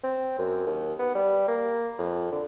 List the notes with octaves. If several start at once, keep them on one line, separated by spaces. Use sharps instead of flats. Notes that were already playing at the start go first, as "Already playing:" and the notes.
C4
F#2
D#2
B3
G3
A#3
F2
D3